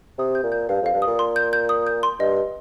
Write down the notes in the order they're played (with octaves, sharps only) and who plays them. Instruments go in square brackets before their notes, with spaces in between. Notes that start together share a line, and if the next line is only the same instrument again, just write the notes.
[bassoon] C3 [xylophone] D#6
[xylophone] G6
[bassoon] A#2
[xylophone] G6
[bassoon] G2 [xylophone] F5
[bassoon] F2 [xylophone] F5
[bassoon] G2
[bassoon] A#2 [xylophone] D#6
[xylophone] C6
G6
G6
D#6
G6
C6
[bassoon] G2 [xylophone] D#5
[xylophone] D#5